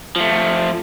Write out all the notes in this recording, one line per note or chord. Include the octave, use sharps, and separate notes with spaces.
F3 A3